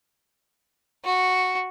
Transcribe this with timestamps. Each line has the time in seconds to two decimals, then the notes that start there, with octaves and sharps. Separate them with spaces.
1.05 F#4